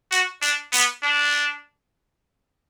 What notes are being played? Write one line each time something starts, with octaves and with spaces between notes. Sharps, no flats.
F#4
D4
B3
D4